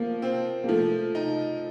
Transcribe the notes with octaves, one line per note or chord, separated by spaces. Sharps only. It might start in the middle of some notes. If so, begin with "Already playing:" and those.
Already playing: F3 A#3
C4
A#3
F3 A3
D#4